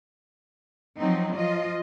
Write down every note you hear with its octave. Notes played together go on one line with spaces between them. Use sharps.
F3 F#3 C4 D#4
F3 F4 D#5